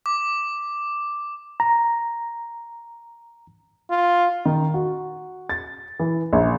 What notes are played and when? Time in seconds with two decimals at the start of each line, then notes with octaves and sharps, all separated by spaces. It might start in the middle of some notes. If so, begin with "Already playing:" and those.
0.06 D6
1.60 A#5
3.91 F4
4.45 D#3
4.74 F#4
5.49 A6
6.00 E3
6.33 A#1